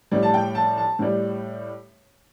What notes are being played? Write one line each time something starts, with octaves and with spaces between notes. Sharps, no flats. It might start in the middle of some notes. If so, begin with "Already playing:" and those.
A2 G3
A5
G5
A5
A5
A2 G3